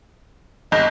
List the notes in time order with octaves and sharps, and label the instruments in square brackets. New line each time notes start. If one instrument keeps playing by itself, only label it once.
[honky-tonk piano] G1 [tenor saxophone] D#5